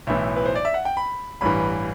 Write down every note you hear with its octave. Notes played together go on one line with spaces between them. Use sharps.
B1 A2 E3 E5
B4
C5
D5
E5
F#5
G5
B5
A1 G2 E3 B5